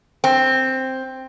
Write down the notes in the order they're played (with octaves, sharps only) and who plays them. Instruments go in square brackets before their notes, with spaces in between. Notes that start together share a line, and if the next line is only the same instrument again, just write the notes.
[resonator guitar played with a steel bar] C4